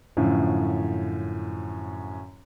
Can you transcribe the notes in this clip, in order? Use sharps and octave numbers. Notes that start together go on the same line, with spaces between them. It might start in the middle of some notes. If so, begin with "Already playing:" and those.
F#2 A2 D3 F3